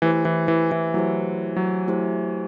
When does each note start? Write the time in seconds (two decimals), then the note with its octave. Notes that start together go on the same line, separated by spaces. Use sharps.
0.02 E3 A3 E4 G4 C5
0.25 E3
0.48 E3
0.72 E3
0.94 F#3 A3 E4 G4 C5
1.56 F#3
1.88 A3 E4 G4 C5